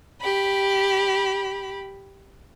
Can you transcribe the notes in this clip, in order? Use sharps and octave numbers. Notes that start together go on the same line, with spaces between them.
G4 B5